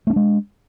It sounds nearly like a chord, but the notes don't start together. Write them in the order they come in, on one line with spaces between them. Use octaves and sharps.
A3 C#4 D4 G#3